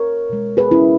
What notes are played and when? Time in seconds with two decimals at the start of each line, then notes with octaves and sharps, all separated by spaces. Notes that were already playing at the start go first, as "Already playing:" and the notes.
Already playing: A#4 C#5
0.30 B2 G#3
0.57 G#4 B4
0.71 C#4 E4